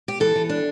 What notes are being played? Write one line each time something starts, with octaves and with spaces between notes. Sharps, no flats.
G4
E3 A4
E3
D4